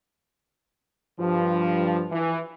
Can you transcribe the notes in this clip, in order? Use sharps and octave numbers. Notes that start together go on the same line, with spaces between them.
G2 F3
E3